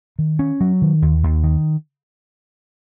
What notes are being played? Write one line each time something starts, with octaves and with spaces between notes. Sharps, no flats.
D#3
C#4
F#3
D#3
D#2
D#2
D#3